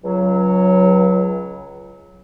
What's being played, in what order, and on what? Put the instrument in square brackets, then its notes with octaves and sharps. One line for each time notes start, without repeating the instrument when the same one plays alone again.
[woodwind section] C#2 F#3